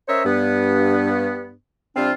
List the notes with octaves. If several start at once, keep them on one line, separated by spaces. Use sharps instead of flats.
C#4 A#4 C5 C#5 D#5 E5
G2 B3
C3 G3 C4 D4 F4